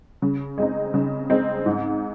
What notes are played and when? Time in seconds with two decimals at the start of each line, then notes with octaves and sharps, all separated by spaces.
0.22 C#3
0.58 G#3 C4 D#4
0.94 C#3
1.30 G#3 C4 D#4
1.66 G#2